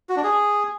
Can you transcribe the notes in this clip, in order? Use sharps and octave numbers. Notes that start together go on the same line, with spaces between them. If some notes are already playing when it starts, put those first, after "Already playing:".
F#4
D4
G#4